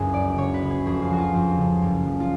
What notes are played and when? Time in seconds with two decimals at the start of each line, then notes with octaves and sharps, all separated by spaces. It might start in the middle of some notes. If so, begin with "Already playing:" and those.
Already playing: F#1 C#2 F#2 G#4 B4
0.14 F#3 D5
0.29 D5
0.38 C#2 C#5
0.54 B4
0.62 C#3
0.70 G#4
0.86 F2 G#4
1.02 F4
1.10 F3 F#4
1.18 F4
1.34 F2
1.58 C#3
1.82 F#1
2.06 F3
2.20 F4